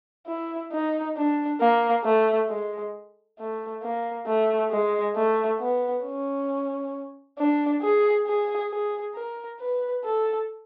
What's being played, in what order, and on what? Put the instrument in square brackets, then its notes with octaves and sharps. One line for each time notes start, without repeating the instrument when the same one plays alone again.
[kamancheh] E4
D#4
D4
A#3
A3
G#3
A3
A#3
A3
G#3
A3
B3
C#4
D4
G#4
G#4
G#4
A#4
B4
A4